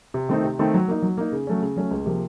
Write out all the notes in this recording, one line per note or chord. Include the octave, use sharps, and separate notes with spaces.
C3
D#3 A3 C4 D#4
C3
D#3 A3 C4 D#4
F#3
A#3 D#4
F#3
A#3 D#4
C#3
F#3 A3 C#4
C#3
F#3 A3 C#4
C#2
C3 F3 A#3